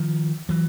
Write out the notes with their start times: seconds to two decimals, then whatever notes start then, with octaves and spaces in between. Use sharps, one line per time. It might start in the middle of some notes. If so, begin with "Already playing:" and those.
Already playing: D#3 F3
0.49 E3 F#3